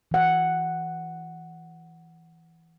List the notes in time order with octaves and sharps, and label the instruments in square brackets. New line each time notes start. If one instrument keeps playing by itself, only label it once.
[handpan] E3 F#5